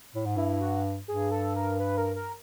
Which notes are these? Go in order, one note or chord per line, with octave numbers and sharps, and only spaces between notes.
A2
G#2
G2 E4
F#4
G2 G#4
A4
A#4
B4
A#4
A#4